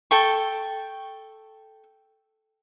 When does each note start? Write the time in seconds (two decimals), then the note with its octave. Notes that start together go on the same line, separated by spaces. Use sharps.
0.11 A4 G5 C#6